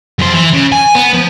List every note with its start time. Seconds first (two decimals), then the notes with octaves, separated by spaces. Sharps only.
0.19 F#2 C5
0.33 E3
0.53 C#3
0.72 G#5
0.95 B3
1.14 F3